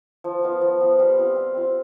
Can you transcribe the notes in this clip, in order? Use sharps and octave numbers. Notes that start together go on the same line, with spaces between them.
F3
B3 F4
F3
B3 F4
G3
C4 F4
G3
C4 F4